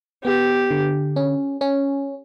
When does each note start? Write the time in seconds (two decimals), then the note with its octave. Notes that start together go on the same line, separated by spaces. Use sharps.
0.24 B3 G4
0.71 D3
1.16 C#4
1.61 C#4